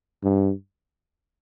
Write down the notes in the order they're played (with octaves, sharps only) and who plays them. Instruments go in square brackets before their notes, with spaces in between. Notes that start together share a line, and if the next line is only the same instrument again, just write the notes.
[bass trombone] G2